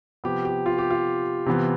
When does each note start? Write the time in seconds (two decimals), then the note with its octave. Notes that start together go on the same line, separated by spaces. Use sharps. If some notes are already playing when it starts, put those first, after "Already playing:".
0.24 C3 F3 B3 G4
0.45 G4
0.66 F4
0.78 G4
0.91 F4
1.46 C3 E3 B3